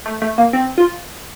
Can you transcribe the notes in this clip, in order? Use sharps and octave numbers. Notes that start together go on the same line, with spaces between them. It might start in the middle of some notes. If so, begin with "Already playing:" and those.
A3
A3
A#3
C4
F4